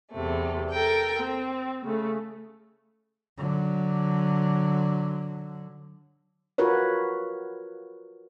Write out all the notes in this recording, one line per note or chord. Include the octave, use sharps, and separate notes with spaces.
E2 C3 A3
A4 A#4 G5
C4
C#3 A3
D3 F#3
F4 F#4 A#4 B4 C#5